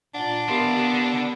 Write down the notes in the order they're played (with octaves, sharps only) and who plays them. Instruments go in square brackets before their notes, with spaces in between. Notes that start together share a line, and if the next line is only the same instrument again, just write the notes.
[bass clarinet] A#2 [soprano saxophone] D4 [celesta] F#5 G7
[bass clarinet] B3 [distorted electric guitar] E4 F5 [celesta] G4 A#4 C6
[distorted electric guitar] D3